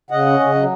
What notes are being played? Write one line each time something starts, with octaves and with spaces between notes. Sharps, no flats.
C#3 D#5 F#5
C#4
C#3
F#3